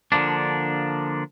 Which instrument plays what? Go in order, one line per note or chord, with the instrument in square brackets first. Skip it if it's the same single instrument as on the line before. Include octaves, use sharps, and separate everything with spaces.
[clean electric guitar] D3 F3 A#3 D4